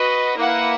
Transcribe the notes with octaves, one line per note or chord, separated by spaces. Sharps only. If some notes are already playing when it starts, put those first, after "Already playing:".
Already playing: F#4 B4 D#5
A#3 E4 B4 F#5